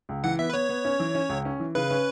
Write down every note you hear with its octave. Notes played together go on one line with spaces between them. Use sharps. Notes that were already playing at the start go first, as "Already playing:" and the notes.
C#2
E3 F#5
B3 E5
B4
B3 C#5
B3
C#4
E3
C#4
C#2
C#4
E3
C#3 B4
C#4